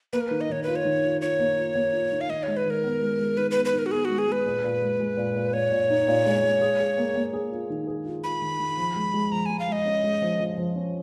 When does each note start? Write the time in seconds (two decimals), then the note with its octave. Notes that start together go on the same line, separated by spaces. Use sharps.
0.13 A#3 B4
0.21 A#4
0.28 D#3 B4
0.41 D#5
0.50 D#3 C#5
0.63 F4 B4
0.76 C#5
0.85 D#3
1.03 F4
1.21 F4 C#5
1.39 A#3
1.58 F4
1.75 A#3
1.93 F4
2.12 D#3
2.21 F5
2.29 D#3 D#5
2.43 G#3 C#5
2.57 B4
2.65 D#3 A#4
2.84 B3
3.01 G#3
3.19 G#3
3.37 D#3 B4
3.51 B3 B4
3.65 B4
3.73 D#3
3.79 A#4
3.86 F#4
3.91 B3 G#4
4.05 G#3 F#4
4.18 G#4
4.27 G#3 B4
4.46 A#2
4.64 A#2
4.82 G#3
5.00 G#3
5.17 A#2
5.35 A#2
5.53 A#2 C#5
5.71 A#2
5.90 D#4
6.08 A#2
6.26 G#3
6.44 G#3
6.61 G#4
6.80 G#4
6.98 A#3
7.16 A#3
7.33 G#4
7.52 F4
7.70 D#3
7.87 G#4
8.06 F4
8.24 F4 B5
8.42 D#3
8.60 D#3
8.77 F3
8.96 G#3
9.14 G#3
9.32 F3 A#5
9.46 G#3 G#5
9.59 F5
9.68 G#3 D#5
9.86 C#4
10.04 G#3
10.22 F3
10.40 F3
10.58 F3
10.76 C#4